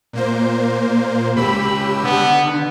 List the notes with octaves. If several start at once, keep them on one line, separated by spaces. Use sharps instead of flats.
A#2 A#3 C5
C#3 G#3 G4 B5 E6
D3 B3